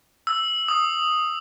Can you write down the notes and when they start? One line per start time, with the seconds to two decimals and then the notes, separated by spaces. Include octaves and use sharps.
0.27 E6
0.68 D#6